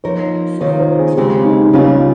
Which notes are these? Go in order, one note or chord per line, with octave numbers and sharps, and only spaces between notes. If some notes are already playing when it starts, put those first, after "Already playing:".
F3 A#3 D#4 A#4 C#5
C3 D#3 A#3 F4 A#4 C#5
C5
G#4
D#2 C#3 G#3 C4 G4
D#4
C#3 G3 A#3 C#4 F4